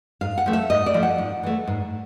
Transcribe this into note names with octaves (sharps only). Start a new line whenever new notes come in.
G#2 F5
F#5
F3 A3
E5
G#2 D#5
D5
F3 A3
F#5
G#2
E3 A3
G#2